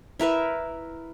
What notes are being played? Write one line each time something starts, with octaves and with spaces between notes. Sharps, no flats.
E4 A#4 B4 E5